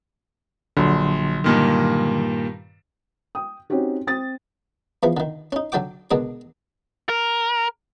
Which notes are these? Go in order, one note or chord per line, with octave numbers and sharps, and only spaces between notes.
A#1 D3 F#3 C6
G2 A#2 D#3
G5 D#6
C4 C#4 D#4 F#4 G4
C4 D#6 A6
E2 E3 F3
D3 D#3
C#4 D#4
D3 F#3 A4 G5 D6
B2 D3 G#3 D4 A#4
A#4